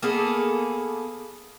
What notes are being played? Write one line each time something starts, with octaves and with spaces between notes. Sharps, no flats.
A#3 B3 G#4 A4